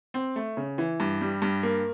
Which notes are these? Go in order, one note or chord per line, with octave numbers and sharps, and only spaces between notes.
C4
A3
C#3
E3
G2
G3
G2
A#3